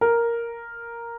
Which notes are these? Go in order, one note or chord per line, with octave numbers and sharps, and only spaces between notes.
A#4